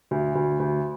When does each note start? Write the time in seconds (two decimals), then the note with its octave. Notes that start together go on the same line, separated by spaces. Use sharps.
0.11 D2
0.35 D2
0.59 D2